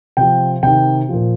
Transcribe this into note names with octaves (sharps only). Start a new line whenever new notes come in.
C3 F3 G5
C3 D#3 G5
A#2 F3